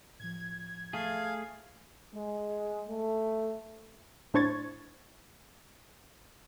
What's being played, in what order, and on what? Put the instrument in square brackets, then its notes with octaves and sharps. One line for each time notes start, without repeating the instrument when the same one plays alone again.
[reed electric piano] A2 F3 [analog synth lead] G#6
[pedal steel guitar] A3 G#4 [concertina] F5
[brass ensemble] G#3
A3
[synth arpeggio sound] A2 D4 C5 C#6 G#6 A6